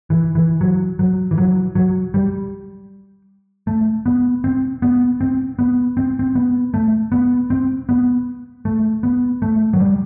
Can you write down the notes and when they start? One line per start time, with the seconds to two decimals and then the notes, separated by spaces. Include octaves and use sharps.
0.10 E3
0.35 E3
0.61 F#3
0.99 F#3
1.31 E3
1.38 F#3
1.75 F#3
2.14 G3
3.67 A3
4.06 B3
4.44 C4
4.82 B3
5.21 C4
5.59 B3
5.97 C4
6.19 C4
6.35 B3
6.74 A3
7.12 B3
7.50 C4
7.89 B3
8.65 A3
9.03 B3
9.42 A3
9.73 F#3
9.80 G3